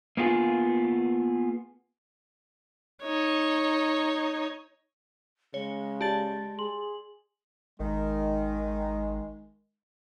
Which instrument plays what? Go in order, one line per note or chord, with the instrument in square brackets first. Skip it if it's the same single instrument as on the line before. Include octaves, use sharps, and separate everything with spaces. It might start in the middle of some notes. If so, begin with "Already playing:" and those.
[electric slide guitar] A#3 B3 F4 G#4
[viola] D#4 C#5
[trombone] C#3 [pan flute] G#3 [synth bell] C#5
[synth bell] G4 D5 A6 [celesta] A5 F#7
[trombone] G#4 [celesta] C6 [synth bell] F#7
[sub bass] G#1 [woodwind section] D#3 [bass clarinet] G#3